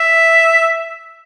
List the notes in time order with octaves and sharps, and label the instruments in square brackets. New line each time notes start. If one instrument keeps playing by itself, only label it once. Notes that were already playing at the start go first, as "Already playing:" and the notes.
Already playing: [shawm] E5